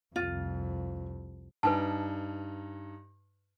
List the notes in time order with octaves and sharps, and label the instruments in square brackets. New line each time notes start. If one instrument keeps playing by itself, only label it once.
[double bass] C2 F2 [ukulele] F4
[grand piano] G2 D#4 [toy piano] B4 G#5 A5